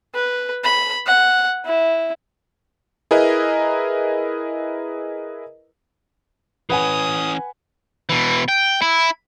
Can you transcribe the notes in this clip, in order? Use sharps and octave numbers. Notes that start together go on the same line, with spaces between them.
B4
B5
F#5
E4
E4 G#4 A#4 B4 D#5 A#5
E3 C#4 B4 F#5 G#5 D#6
B2 E3
G5
E4